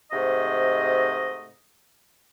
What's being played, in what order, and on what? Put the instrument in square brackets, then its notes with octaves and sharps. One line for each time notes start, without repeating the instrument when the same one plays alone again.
[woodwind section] G#2 C3 A3 D#5